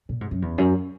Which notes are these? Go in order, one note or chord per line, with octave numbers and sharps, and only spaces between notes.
A#2
G#2
F#2
E2
F#2